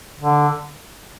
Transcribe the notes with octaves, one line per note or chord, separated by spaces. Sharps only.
D3